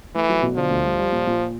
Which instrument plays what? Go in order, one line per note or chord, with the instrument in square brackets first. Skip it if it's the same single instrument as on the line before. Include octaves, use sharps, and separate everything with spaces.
[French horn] E3 [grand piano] A3
[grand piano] F#3
B2
[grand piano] D3 [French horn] F3
[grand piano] D2
G3
G3
A#2
A#2